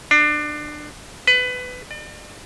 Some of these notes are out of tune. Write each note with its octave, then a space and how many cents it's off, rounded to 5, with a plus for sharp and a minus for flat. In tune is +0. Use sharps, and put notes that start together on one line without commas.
D4 +25
B4 +20
D5 +40